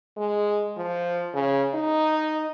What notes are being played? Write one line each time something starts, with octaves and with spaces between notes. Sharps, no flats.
G#3
F3
C#3
D#4